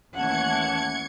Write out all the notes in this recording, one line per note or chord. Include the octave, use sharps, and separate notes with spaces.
D#2 E3 A3 C#4 F#5 A5 G#6 C#7